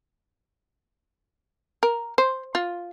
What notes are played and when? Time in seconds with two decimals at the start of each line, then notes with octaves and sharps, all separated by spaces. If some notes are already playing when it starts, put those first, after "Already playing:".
1.83 A#4
2.18 C5
2.55 F4